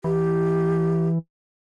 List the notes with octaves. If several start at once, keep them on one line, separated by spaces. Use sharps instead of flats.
E3 G4